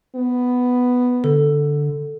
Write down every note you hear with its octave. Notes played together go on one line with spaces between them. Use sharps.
B3
D3 A4